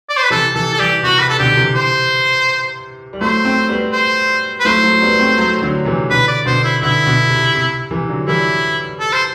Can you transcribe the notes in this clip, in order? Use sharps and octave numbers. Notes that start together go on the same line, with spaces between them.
D5
C5
B4
C3 E3 A4
C3 E3 A4
A4
E3 G3 G4
C3 F#4
C3 B4
A4
B2 D3 G4
C3 E3
C5
G3
F#3 A3 C5
A3 C4
G3 B3
C5
B4
F#3 A3 C5
F#3 A3
G3 B3
A3 C4
F#3 A3
D3 F#3
C3 E3
B2 D3 B4
D5
B2 D3 C5
E4
B2 D3 E4
B2 D3
C3
C3
C3 E3
D3 F#3
E3 G3 E4
A4
C5